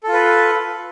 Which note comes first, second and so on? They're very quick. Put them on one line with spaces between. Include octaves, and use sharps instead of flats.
A4 F4 B4